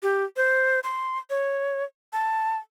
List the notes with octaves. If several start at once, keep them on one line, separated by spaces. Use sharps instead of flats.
G4
C5
C6
C#5
A5